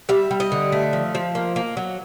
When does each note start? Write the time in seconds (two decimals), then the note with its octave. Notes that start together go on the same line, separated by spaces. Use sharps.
0.09 G3 E5
0.31 G3
0.40 D#5
0.52 D3
0.72 A3
0.93 F3
1.15 F3
1.35 A#3
1.56 A#3
1.77 F#3